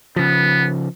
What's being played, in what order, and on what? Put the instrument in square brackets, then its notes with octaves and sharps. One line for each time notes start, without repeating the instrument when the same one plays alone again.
[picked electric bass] C#3 F3 [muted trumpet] B3